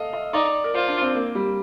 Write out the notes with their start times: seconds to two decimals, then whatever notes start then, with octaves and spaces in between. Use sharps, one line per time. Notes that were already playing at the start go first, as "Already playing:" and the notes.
Already playing: A4 D#5 F5
0.13 D#5
0.33 D#4 D5
0.64 A#4
0.74 F4 C5
0.88 D4
1.01 C4
1.15 A#3
1.35 G3